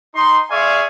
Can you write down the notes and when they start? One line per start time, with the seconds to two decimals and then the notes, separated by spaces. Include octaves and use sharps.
0.15 D#4 C6
0.51 G#4 D5 E5 F5 G#5 C#6